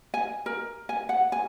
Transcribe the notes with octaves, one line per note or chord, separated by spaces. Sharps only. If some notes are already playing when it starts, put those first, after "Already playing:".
G#5
A#4
G#5
F#5
G#5